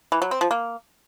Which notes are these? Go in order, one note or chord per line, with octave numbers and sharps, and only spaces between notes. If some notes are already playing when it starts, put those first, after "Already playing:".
E3
F#3
C4
F3
A#3